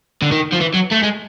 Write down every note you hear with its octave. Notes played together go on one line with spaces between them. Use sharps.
D3
D#3
F3
E3
F#3
A3
G#3